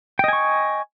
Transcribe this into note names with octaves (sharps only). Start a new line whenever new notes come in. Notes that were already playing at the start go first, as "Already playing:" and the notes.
D#5 G5 G#5 C#6